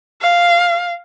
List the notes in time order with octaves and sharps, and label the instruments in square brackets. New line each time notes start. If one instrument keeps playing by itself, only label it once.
[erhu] F5